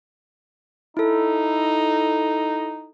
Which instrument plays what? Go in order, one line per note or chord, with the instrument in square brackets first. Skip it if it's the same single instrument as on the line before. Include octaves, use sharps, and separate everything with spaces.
[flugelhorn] D#4 [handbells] E4 A4